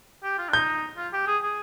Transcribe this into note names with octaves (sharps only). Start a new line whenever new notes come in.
G4
F4
D4
D#4 G6
F4
G4
G#4
G#4